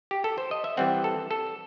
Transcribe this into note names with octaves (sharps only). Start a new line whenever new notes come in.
G4
A4
C5
D#5
E5
E3 G3 C4 F#5
A4
A4